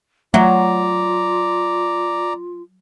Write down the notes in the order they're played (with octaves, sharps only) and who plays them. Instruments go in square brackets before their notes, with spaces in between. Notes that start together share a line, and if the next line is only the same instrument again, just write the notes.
[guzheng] F#3 [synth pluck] A3 [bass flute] F4 [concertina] D5 A#5